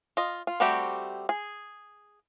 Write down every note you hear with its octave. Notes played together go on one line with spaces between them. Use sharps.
F4 D#5
F4
G3 A3 C4 F#4 G4
G#4